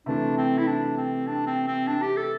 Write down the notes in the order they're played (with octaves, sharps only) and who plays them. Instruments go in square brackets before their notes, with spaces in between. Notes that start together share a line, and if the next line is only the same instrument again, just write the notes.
[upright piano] C3 E3 A3 [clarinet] D4
[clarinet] C4
E4
D4
C4
D4
C4
C4
D4
G4
A4